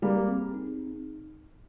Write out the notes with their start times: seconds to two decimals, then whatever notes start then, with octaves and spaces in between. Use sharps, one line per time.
0.02 G3 A#3 G#4
0.29 C4
0.55 D#4